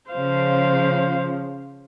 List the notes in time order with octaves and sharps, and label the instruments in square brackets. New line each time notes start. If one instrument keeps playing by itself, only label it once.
[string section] C#3 F3 [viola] C5 F5